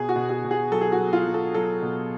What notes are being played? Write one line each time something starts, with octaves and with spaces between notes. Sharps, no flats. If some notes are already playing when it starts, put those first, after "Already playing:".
Already playing: B2 G#4
F#4
B2
G#4
B2
G#4
F#3 A4
G#4
F#4
F#3
F4
F#3
A4
F#3 A4
B2